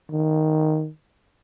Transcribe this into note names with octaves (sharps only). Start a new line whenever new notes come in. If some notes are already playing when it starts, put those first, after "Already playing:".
D#3